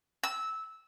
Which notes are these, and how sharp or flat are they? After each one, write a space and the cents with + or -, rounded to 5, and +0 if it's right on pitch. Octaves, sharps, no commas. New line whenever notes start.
E6 -15